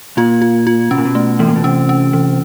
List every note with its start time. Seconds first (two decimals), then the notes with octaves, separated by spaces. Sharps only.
0.17 A#2 F4
0.42 F4
0.67 F4
0.91 B2 C#4
0.98 A#2
1.05 B2
1.15 A3
1.39 A2 E3
1.48 A#2
1.56 B2
1.64 C3 C#4
1.89 C#4
2.13 E3